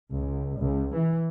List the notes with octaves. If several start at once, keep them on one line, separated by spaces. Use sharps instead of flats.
C#2
C#2
E3